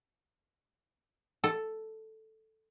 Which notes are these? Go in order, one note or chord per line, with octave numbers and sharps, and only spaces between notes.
A4